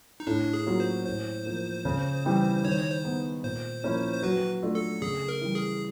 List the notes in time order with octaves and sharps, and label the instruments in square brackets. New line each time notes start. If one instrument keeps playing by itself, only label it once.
[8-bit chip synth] D#4
[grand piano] A2 [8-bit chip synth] D4
[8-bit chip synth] G#4
[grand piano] F#3 A#3 C#4 F4
[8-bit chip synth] C5
[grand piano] A2 [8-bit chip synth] C5
[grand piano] F3 A#3
C#3
E3 G3 C4
[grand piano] D#3 [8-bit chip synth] C#5
[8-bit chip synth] C5
C#5
C5
[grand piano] G#3 B3 D#4
[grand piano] A#2 [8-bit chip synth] C5
[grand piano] F3 A#3 C#4 E4
[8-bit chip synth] C5
[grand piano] F#3 [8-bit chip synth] B4
[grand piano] A3 D4 F4
[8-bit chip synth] A4
[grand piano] C#3 [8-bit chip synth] G#4
[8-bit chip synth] A#4
[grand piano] E3 G3
[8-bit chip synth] G#4